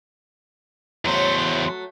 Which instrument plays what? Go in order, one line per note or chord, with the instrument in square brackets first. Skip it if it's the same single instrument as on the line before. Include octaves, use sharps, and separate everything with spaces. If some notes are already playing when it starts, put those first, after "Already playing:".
[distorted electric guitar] E2 C5 [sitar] F#3 A3